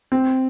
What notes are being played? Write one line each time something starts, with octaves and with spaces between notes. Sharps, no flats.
C4